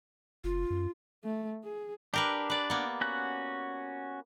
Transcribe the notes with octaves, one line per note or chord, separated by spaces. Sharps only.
F#1 F4
F#2
A3
G#4
D4 G4 A#4 B4
B4 D5
A#3 B3
C#4 F#4 F#6